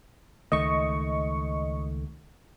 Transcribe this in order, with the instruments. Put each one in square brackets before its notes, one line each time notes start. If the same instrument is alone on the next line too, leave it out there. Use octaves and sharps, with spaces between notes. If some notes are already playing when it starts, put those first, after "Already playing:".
[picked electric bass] C#2 D#3 A3 [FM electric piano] D#5 C#6